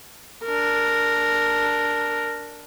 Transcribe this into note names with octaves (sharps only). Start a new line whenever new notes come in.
D4 A#4